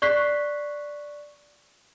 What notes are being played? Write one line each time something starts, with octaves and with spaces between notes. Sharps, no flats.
D5 C#6 F#6 B6 C7